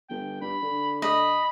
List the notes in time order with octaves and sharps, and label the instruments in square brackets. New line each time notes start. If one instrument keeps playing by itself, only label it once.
[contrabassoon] G1 [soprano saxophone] G5
[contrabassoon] G2 [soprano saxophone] B5
[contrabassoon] D3
[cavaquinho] D#5 [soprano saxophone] B5